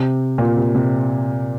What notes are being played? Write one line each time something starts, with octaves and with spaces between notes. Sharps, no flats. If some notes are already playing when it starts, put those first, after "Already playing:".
Already playing: C3
A#2
C3
C3